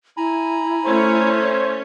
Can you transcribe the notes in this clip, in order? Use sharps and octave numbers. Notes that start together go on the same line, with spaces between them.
E4 G#5 A#5 B5
A3 C#4 C5 C#5